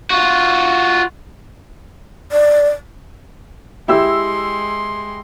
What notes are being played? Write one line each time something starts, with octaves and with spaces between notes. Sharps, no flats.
F4 F#4
D5
G#3 E4 G4 C6 E6